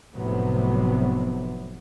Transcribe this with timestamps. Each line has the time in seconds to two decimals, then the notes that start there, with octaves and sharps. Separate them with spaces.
0.14 F1 A2 C3 F#3 B3